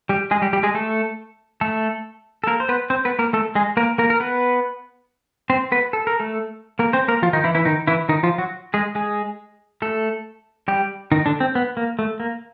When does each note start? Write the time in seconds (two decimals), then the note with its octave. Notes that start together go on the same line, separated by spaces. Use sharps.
0.09 G3 G4
0.31 G#3 G#4
0.42 G3 G4
0.53 G3 G4
0.63 G#3 G#4
0.74 A3 A4
1.61 A3 A4
2.44 A4
2.47 A#3 A#4
2.60 C5
2.69 B3 B4
2.90 C4 C5
3.05 B3 B4
3.19 A#3 A#4
3.33 A3 A4
3.55 G#3 G#4
3.77 A#3 A#4
3.98 A#3 A#4
4.10 A#4
4.20 B3 B4
5.50 C4 C5
5.72 B3 B4
5.93 A4
6.07 A#4
6.20 A3 A4
6.79 A#3 A#4
6.93 C4 C5
7.08 A#3 A#4
7.22 F3 F4
7.33 D#3 D#4
7.44 E3 E4
7.55 E3 E4
7.65 D#3 D#4
7.87 E3 E4
8.09 D#3 D#4
8.23 F3 F4
8.38 F#3 F#4
8.74 G#3 G#4
8.95 G#3 G#4
9.82 A3 A4
10.68 G3 G4
11.12 D#3 D#4
11.26 D3 D4
11.40 C4
11.55 B3
11.77 A#3
11.99 A3
12.20 A#3